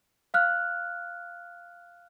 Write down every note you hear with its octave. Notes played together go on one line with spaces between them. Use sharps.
F5 F6 F#6